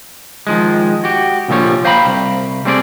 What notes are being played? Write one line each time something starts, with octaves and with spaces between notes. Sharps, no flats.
D#3 F3 G#3
F#4 G4
C2 A#2 D3 F3 G3 C#5
C5 F5 G5 A#5 B5
C2
G3 A3 C4 G#4 C5 D5